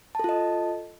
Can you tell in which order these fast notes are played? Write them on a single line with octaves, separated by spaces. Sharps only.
A5 A4 F4 D#5